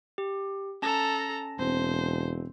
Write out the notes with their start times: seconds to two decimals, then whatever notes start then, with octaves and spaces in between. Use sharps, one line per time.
0.18 G4
0.82 C#4 A4 A5 A#5 A#6
1.59 E1 C4 C5